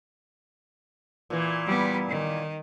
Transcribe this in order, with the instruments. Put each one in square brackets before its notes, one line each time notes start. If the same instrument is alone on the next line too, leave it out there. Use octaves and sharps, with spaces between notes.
[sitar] A#2 E3
[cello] G3 B3
D#3